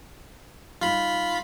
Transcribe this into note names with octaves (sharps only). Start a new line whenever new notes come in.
G3 D#4 F4 B5